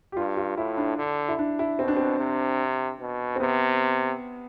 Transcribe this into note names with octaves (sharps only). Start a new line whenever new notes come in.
G4
G2 F4
F4
A2 E4
D4
D3
E4
D4
E4
B2 C4
D4
C4
C3
B2
C4
C3 B3